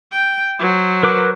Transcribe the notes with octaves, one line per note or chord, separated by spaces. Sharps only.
G5
F#3 C5
A#4 B4 D6